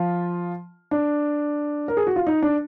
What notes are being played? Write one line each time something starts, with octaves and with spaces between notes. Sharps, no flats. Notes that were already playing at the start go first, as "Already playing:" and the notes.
Already playing: F3 F4
D4
A#4
G#4
F#4
F4
D#4
D4